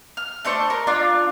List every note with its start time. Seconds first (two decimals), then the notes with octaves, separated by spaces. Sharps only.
0.17 F6
0.45 A3 D4 C5 C#6
0.70 A#4
0.87 D4 F4 F5